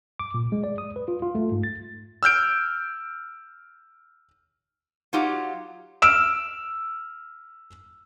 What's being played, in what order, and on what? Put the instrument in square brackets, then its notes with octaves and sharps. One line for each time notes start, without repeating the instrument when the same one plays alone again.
[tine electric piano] D6
A#2
G#3
D5
D#6
B4
F4
F4
A3
G#2
A6
[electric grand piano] E6 F6 G6 D7
[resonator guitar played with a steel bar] F#3 D#4 F4 G4 F#5
[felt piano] E6 F6 D7 E7